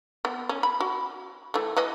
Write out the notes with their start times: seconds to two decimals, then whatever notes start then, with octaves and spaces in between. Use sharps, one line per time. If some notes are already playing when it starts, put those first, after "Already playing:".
0.25 B3
0.49 C#4
0.63 B5
0.80 F#4
1.54 E3 A3
1.76 E3 B4 D#5